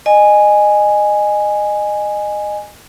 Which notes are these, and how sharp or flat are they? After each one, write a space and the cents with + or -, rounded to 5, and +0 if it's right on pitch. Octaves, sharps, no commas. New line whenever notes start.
D#5 -25 G#5 +0